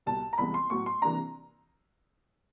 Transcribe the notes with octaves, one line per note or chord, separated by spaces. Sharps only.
C2 B2 G3 A5
A#5
C2 C3 E3 G#3 B3 B5
C6
A2 F#3 B3 C#6
C6
C3 E3 G3 A#3 D4 A#5